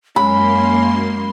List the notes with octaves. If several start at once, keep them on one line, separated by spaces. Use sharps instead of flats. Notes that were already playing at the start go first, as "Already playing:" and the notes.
F#2 G#3 A#3 C#4 B5 C6